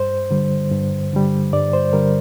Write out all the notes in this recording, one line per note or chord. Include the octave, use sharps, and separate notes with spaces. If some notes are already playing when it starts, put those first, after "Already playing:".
Already playing: G2 C5
D3 G3
G2
D3 G3
G2 D5
C5
D3 G3 A#4